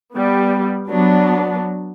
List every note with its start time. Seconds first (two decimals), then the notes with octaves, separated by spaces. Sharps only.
0.15 G3 B3
0.91 F#3 B3 D4